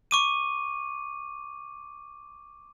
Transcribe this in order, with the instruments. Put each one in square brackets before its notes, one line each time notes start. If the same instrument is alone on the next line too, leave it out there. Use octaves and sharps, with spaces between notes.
[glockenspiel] C#6 D6 D#7